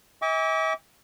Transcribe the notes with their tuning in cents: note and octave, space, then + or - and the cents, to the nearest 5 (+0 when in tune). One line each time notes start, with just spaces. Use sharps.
E5 -45 G#5 -45 D6 -35